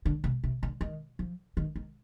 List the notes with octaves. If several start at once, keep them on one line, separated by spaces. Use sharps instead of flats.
D3
C3
C3
D3
D#3
F3
D#3
D#3